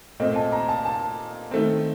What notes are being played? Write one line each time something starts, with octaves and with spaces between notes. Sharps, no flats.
A#2 A3 C4 D#5
A5
A#5
A5
A5
D#3 A3 C4